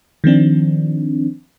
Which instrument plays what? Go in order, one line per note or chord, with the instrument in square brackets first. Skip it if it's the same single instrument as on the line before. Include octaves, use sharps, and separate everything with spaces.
[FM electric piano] D#3 F3 C4 D4